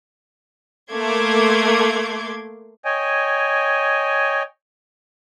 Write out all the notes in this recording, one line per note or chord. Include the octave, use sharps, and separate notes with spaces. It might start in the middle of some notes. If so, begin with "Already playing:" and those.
A3 A#3 C6 D6 G#6
C#5 D#5 G5 G#5